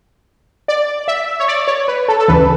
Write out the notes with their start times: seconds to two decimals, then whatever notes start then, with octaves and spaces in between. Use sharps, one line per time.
0.68 D5
1.08 E5
1.40 C#5
1.48 D5
1.68 C#5
1.88 B4
2.08 A4
2.19 A4
2.28 D2 C#3 E3 B4